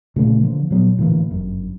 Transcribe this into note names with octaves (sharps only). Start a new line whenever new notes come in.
A#2 C#3 A3 A#3
D3 F3 A#3
A#2 F#3 B3
A2 D3 E3 A#3
G1 F#2